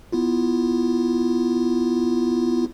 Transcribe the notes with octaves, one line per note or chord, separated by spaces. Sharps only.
B3 E4 F4